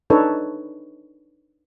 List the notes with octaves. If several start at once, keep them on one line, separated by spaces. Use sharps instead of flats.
D4 D#4 A4 B4 C#5 D#5